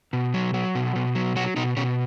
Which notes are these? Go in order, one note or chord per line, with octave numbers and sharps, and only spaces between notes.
B2
F#3
F#3
B2
B2
F#3
F#3 F#4
B2 D#4
B2 C#4